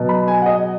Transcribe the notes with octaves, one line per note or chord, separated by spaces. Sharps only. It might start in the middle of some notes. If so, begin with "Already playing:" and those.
Already playing: B2 F#3
B5
G#5
F#5
D#5